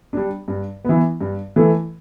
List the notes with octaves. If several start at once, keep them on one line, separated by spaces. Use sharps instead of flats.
G3 D4
G2
E3 B3
G2
E3 A3